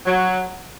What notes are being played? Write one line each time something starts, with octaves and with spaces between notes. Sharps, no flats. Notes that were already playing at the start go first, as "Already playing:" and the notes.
F#3